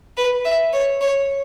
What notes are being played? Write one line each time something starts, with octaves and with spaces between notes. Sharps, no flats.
B4
E5
C#5
C#5